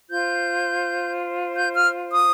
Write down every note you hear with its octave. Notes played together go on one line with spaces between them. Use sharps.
F4 C5 G6
G6
F6
D#6